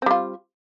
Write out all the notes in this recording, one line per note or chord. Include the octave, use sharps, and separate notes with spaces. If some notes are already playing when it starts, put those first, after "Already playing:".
G3 C4 F4